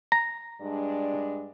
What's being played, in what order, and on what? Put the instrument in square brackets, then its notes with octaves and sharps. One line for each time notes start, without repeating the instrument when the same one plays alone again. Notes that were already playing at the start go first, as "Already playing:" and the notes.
[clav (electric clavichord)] A#5
[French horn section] G2 G#3 D4